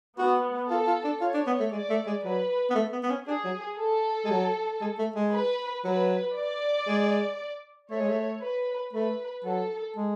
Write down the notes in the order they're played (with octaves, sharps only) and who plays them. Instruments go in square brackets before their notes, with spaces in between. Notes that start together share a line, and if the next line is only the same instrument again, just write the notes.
[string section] B3 [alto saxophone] F#4
[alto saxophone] F4 [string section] A4
[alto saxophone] F4
D4
[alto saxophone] F4 [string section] C#5
[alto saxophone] D4
B3
A3
[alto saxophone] G#3 [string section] D5
[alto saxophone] A3
G#3
[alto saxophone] F#3 [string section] B4
[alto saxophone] B3
A3
B3
B3
C#4
[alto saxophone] D4 [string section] G#4
[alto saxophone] F#3
[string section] A4
[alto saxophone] G#3
F#3
G#3
A3
G#3
[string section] B4
[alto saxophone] F#3 [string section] B4
[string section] D5
[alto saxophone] G#3
[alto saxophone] A3 [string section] C#5
[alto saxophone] G#3
A3
[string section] B4
[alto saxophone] A3 [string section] B4
[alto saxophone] F#3 [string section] A4
[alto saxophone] G#3